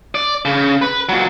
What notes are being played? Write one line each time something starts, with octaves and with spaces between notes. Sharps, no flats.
D5
C#3
B4
A#2 F#3